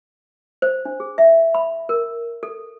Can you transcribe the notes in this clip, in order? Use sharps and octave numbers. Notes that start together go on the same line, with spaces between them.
C5
D4
G#4
E5
B5
A#4
A4